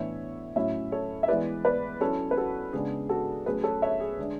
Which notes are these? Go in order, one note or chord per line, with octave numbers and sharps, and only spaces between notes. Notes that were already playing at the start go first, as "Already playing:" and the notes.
Already playing: A2 E3 B3 D4 C#5 E5
A2 F#3 C#4 E4 C#5 E5
A4 C#5
E5
E3 G#3 B3 E4 B4 D5
B4 D5
F#3 C#4 E4 A4 C#5
B4
F#4 A4
C#3 G#3 B3 D4 G#4
F#4 A4
F#3 A3 C#4 G#4 B4
A4 C#5
C#5 E5
G#4
D3 G#3 D4